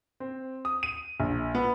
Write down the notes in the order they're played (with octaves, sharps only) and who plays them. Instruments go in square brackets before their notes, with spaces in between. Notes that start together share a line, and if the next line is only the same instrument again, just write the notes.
[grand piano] C4
D#6
D#7
A#1
B3